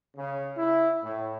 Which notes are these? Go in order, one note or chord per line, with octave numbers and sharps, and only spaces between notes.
C#3
E4
A2